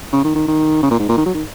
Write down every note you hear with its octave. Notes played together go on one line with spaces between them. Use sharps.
C#3
D#3
D#3
D#3
C#3
A#2
G#2
A#2
D#3
F#3
D#3